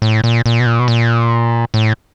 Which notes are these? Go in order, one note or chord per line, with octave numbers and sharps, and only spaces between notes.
A2
A#2
A#2
B2
A#2
B2
A#2
A2